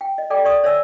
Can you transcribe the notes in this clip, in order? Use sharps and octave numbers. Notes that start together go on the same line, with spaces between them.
G5
D#5
A4 D5 G5 D6
G#4 D5 C#6 D#6
C#5 D5 E5 G#5 E6